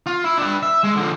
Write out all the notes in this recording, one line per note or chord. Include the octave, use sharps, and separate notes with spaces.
F4
E4
D4 B4
E5
G#3
D3 F3